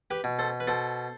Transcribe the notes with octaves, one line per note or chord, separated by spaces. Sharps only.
G4 B4
B2
A4 C5
B4
B2 A4 C5